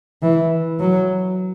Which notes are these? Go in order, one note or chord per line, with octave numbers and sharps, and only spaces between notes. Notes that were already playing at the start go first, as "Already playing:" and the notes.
E3
F#3